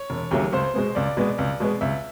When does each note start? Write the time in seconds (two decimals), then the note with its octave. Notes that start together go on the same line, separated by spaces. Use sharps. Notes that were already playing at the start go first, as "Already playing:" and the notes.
Already playing: C#5
0.10 E1
0.31 D#2 C#3 F#3 A3
0.52 C#2 C5
0.74 B2 G#3 B3
0.95 C#2 D5
1.17 B2 G#3 B3
1.38 C#2
1.60 B2 G#3 B3
1.81 C#2 E5